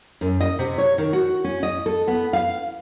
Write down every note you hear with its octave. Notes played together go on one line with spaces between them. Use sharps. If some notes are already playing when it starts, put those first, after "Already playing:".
F#2
D#5
C3
C#5
D#3
F#4
C#4
D#5
A4
B3
F5